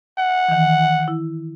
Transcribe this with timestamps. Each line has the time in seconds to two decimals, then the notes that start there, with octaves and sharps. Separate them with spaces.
0.19 F#5
0.48 D#3 E3
1.08 E4